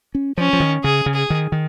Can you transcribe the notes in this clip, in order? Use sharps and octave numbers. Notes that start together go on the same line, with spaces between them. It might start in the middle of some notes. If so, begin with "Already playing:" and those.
C#4
F3 C#4
F3
D#3
C#3 G#4
C#3
G#4
D#3
D#3